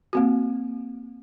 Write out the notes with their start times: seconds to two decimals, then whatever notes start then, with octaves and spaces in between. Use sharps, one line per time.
0.13 A#3 C4 F#4